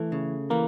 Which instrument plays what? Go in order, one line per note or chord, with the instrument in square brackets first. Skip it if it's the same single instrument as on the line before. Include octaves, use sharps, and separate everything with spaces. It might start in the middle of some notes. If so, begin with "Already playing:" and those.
Already playing: [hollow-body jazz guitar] E3 [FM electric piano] A3
[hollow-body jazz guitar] C#3
[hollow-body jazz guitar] E3 [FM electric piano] A#3